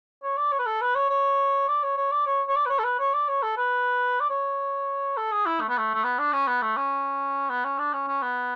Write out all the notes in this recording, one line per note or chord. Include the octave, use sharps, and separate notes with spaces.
C#5
D5
C#5
B4
A4
B4
C#5
C#5
D5
C#5
C#5
D5
C#5
C#5
D5
B4
C#5
A4
B4
C#5
D5
C#5
A4
B4
D5
C#5
A4
G#4
E4
A3
B3
A3
A3
B3
D4
C#4
B3
A3
C#4
B3
C#4
D4
C#4
C#4
B3